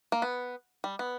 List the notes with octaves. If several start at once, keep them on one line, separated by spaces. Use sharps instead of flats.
A#3
B3
G3
B3